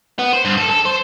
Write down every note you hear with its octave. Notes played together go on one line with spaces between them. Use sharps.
B3
C5
G2
A4
A4
C5